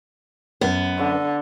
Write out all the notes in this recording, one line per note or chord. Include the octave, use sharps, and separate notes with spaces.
F#2 B3
D3